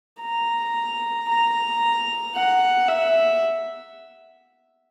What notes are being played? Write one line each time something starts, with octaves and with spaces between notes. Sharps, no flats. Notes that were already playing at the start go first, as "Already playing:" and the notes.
A#5
A#5
F#5
E5